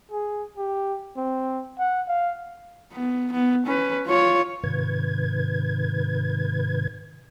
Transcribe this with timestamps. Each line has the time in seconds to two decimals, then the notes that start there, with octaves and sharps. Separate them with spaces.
0.12 G#4
0.57 G4
1.17 C4
1.79 F#5
2.08 F5
2.92 B3
3.32 B3
3.66 C#4 B4
4.07 F4 C#5
4.64 G#2 C3 D#3 B4 G#6